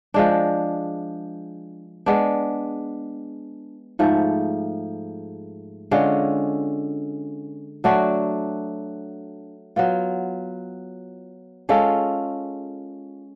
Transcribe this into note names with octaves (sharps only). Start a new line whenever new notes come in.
F3 G#3 D4
G#3 B3 D4
G#2 F3 A3
D3 G#3 C#4 F4
F#3 A3 D4 F#4
F#3 B3 F4
G#3 C#4 F4 A4